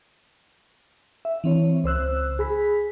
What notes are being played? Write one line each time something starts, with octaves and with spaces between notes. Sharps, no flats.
E5
E3 C4 C#5
C#2 C5 E6 F#6
G#4 B5 B6